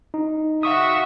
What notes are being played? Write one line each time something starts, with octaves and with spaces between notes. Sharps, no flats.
D#4
F#4 E5 F5 C#6 D#6